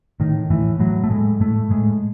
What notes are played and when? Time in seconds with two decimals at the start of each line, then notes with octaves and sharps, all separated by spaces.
0.20 A2 D#3
0.50 A2 E3
0.80 A2 F#3
1.04 A3
1.10 A2 G#3
1.41 A2 A3
1.70 A2 G#3